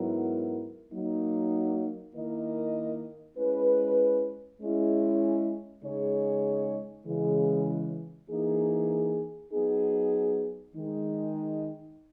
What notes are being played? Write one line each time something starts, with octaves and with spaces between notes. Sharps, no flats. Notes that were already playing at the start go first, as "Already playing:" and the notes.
Already playing: G#2 F#3 B3 E4 A#4
F#3 A#3 D#4
D#3 A#3 E4 A#4 D#5
G#3 C#4 E4 B4
G#3 C#4 E4
C#3 G#3 D#4 G#4 C#5
C#3 E3 G#3
E3 A#3 D#4 G#4
F#3 B3 D#4 G#4
D#3 G#3 D#4